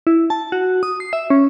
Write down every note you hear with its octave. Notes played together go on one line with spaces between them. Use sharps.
E4
A5
F#4
D#6
C7
E5
C#4